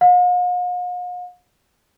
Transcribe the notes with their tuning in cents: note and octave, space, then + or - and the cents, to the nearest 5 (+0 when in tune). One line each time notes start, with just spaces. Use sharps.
F5 +45